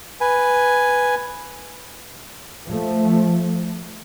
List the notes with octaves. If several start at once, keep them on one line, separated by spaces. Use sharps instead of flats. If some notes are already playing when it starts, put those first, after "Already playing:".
B4 G#5
F3 A3